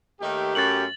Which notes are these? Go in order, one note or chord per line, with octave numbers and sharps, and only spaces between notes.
D#2 D#3 A3 D#4 G4
F#2 A6 F#7